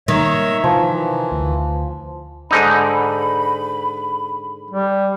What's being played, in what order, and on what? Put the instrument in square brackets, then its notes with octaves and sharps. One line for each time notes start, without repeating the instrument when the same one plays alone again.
[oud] D#3 [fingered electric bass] G3 G#3 A#3 [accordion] C#5 E5
[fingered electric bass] C3 [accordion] E3 [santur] F3
[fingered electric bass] D2
[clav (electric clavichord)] G#2 D3 D#4 [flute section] B5
[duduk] G3